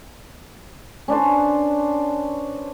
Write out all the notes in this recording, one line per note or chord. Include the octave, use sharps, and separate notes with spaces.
C#4 D4 B4 C5